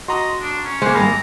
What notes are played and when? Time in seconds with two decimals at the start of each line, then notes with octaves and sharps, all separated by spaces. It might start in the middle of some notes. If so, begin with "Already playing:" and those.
0.08 F#4 D#5 A#5 C6 D#6
0.41 D4
0.65 C#4
0.82 G#3 A#3 C5
0.95 G#1 G3 G#4 G5 A#5 B5